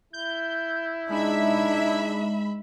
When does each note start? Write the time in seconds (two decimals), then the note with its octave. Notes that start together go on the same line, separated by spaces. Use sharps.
0.13 E4 G6
1.09 G#3 D4 D#4 E5 B5